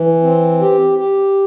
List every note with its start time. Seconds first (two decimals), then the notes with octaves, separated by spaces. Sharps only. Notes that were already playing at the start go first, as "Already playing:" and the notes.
Already playing: E3
0.23 C4
0.61 G4
0.99 G4